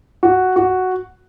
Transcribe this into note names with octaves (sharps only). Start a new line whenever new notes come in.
F#4
F#4